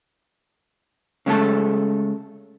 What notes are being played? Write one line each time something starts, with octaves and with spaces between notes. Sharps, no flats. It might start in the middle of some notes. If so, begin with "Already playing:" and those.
C#3 G#3 A3 A4